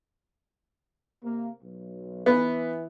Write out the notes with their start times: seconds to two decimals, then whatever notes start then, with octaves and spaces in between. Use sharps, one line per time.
1.23 C3 A#3
1.61 B1
2.26 E3 B3